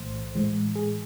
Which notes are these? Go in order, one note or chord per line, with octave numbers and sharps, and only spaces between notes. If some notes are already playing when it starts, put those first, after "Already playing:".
Already playing: B1 A2 E3 A3 C5
A2 E3 G#3
G#4